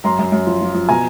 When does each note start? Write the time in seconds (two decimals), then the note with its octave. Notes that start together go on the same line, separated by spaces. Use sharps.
0.04 F#2 A#5 C6
0.19 F#2
0.32 F#2
0.47 F3
0.61 F3
0.74 F3
0.89 B2 G#5 A#5